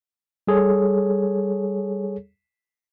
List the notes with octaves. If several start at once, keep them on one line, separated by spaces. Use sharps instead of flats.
G3 G#4 A4 C#5